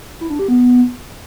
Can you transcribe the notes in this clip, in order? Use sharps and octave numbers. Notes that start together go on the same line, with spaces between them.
E4
D4
G4
B3